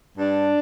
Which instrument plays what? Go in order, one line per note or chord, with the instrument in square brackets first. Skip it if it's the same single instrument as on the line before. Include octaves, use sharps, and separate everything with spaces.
[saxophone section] G2 D4